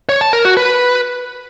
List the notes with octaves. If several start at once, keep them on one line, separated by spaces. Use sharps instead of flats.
C#5
A5
A#4
F#4
B4